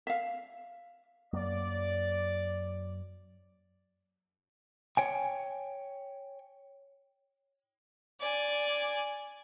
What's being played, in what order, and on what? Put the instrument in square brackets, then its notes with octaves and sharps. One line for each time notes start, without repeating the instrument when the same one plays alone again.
[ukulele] E5 F5
[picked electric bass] F#2 F#3 A#3 [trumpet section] D5
[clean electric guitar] C#5 G5 G#5
[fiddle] D5 G#5